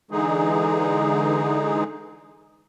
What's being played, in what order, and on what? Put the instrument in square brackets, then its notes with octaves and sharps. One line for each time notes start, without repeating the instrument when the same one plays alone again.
[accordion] D3 E3 G#3 D#4 G#4